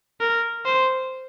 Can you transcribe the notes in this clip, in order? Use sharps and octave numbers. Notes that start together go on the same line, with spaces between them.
A#4
C5